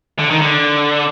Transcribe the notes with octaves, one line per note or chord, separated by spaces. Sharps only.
D3
D#3
D3